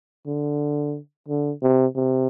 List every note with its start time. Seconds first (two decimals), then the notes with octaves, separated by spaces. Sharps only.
0.27 D3
1.28 D3
1.63 C3
1.96 C3